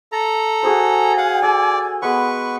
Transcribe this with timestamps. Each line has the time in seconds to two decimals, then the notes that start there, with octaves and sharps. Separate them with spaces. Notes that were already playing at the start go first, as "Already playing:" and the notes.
0.12 A4 A#5
0.63 F#4 G#4 C5 G#5
1.18 F5 F#5
1.43 A4 D5
2.02 G#3 B3 B4 F#5 C#6